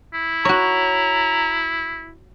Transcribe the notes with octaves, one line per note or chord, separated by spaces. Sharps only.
E4
F#4 C#5 A#5